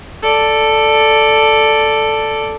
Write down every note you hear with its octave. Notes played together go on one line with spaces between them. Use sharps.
A4 D5